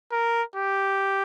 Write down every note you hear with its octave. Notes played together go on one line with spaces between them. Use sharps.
A#4
G4